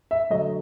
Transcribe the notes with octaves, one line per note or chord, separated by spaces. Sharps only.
E5
D3 F#3 A3 D#5